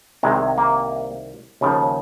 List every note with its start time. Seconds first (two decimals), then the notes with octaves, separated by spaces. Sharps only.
0.23 C2 C3 D#3 G#3
0.58 A#3
1.61 D#2 C#3 F3